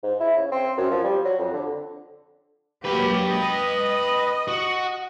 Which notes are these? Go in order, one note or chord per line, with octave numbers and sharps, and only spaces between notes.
G#2
E4
C#3
C4
F#2
F3
G3
F#3
F2
D3
F#3 A#3 G4 B4 G5
D#5
F#4